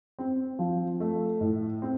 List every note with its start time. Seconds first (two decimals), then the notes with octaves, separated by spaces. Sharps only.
0.19 C4
0.59 F3
1.00 A3
1.41 A2
1.82 C4